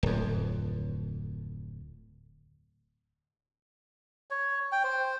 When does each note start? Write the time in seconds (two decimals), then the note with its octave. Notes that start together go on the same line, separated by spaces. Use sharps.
0.03 D1 F2
4.31 C#5
4.72 G5
4.84 C5